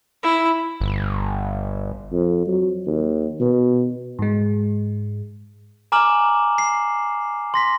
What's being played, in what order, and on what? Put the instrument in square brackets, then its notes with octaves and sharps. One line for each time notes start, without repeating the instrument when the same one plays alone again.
[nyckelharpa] E4
[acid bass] G1
[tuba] F2
F#3
D#2
B2
[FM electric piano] G#2 G#3
[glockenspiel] G#5 A#5 D6 F6 E7 F#7
C7
C6 A#6 B6